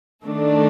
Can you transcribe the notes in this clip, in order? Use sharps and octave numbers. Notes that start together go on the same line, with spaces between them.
D#3 A3 D4